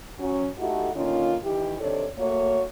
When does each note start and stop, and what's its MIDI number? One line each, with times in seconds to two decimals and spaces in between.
0.19 0.46 54
0.19 0.46 61
0.59 0.90 57
0.59 0.90 63
0.59 0.90 64
0.59 0.90 66
0.59 0.90 67
0.59 0.90 69
0.94 1.35 50
0.94 1.35 51
0.94 1.35 58
0.94 1.35 61
0.94 1.35 65
1.44 1.78 51
1.44 1.78 52
1.44 1.78 64
1.44 1.78 67
1.80 2.05 48
1.80 2.05 51
1.80 2.05 62
1.80 2.05 69
1.80 2.05 73
1.80 2.05 74
2.18 2.62 57
2.18 2.62 58
2.18 2.62 66
2.18 2.62 73